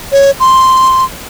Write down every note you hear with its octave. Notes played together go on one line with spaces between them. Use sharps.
C#5
C6